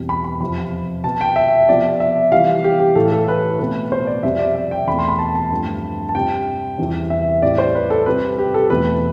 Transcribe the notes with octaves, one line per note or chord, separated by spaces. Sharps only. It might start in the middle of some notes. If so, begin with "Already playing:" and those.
Already playing: E2 B2 G3 C4
B5
B5
F2 C3 F3 B5
B2 B3 A5
G5
E5
C3 F3 B3 D5
E5
C3 E3 G3 B3 F5
G4
G4
A2 E3 A3 A4
A4
B4
B2 A3 C4 B4
C5
D5
F2 C3 G3 C4 E5
D5
E5
G5
E2 B2 A3 C4 B5
C6
B5
A5
A5
G2 F3 A3 C4
A5
C3 G3 C4 G5
E2 C3 E3 G3 C4
E5
A2 G3 C4 D5
C5
B4
A4
C3 G3 C4 B4
G4
A4
E2 B2 A3 C4 B4